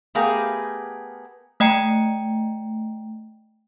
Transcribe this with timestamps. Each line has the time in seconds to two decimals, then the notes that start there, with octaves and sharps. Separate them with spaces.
0.15 A3 B3 G4 G#4 A#4 F5
1.60 A3 D#5 G5 A#5 C#7